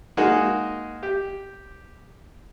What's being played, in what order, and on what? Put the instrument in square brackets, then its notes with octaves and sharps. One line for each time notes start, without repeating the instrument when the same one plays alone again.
[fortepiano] G#3 A#3 D#4 F#4 G#4
G4